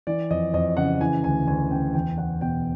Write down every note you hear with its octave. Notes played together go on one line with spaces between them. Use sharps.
E3 D5
F2 D#5
F2 D#5
C#3 F#5
E3 G#5
D2 G#5
D2 G#5
C#3 G5
E2 G5
E2 F#5
B2 G5